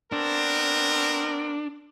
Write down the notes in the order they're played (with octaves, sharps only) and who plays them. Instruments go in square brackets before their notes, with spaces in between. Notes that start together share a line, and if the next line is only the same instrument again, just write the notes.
[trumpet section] B3 C4 A#4 [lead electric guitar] D4